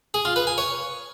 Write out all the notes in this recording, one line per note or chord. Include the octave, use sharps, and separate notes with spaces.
G#4
F4
B4
G#5
C#5